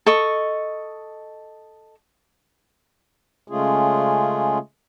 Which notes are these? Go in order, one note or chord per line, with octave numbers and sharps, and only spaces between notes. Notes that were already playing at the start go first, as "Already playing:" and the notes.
A4 D#5 C#6
C#3 G#3 A3 C#4 F4 G#4